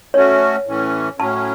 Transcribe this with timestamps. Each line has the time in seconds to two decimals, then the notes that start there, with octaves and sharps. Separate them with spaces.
0.14 A3 C#4 F#4 C#5
0.67 A2 E3 C#4
1.19 A2 F#3 C#4 A5